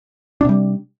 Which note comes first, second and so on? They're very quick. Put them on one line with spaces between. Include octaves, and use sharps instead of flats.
D4 C3 G3